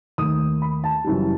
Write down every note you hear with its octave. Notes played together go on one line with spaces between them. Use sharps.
D#2 D#3 A3 D#6
B5
A5
F#1 F#2 E3 G3